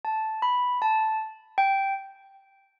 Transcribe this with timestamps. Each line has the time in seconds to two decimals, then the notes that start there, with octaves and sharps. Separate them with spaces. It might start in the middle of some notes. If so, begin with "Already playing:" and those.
0.05 A5
0.42 B5
0.82 A5
1.58 G5